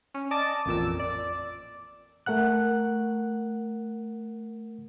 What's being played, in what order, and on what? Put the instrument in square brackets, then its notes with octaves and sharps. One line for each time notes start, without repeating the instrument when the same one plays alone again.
[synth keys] C#4
D5 D#5 A5 D6 A6
A1 F2 A#2 E6
D5
[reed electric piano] A3 A#4 F#5 F#6